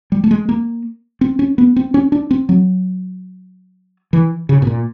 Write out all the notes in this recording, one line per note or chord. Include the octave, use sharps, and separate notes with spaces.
G3
A3
G#3
A#3
C4
C#4
B3
C4
C#4
D4
C4
F#3
E3
C#3
B2
A#2